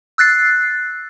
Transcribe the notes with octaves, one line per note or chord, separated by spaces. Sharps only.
E6 F#6 A6 C7